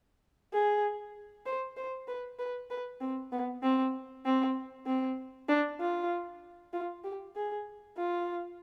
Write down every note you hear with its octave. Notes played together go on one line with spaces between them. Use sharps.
G#4
C5
C5
B4
B4
B4
C4
B3
C4
C4
C4
D4
F4
F4
G4
G#4
F4